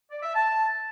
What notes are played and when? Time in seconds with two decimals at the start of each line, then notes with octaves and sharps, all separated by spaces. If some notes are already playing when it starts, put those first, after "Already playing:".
0.11 D5
0.23 E5
0.35 A5